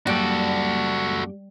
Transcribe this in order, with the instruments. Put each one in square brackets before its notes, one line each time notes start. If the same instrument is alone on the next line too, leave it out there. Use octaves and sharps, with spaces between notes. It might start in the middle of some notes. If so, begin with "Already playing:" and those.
[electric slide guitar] F#2 A#3 G5 [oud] G3 [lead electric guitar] F#4 A4